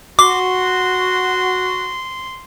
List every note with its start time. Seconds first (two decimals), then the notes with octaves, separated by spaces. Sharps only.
0.19 F#4 C6 D6